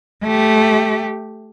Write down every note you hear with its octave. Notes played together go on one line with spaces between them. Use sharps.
A3 G4